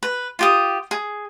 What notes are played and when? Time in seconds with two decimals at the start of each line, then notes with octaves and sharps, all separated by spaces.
0.03 B4
0.39 F4 G4 D#6
0.91 G#4